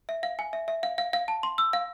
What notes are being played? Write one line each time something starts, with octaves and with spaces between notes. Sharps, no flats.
E5
F5
G#5
E5
E5
F5
F5
F5
A5
C6
E6
F5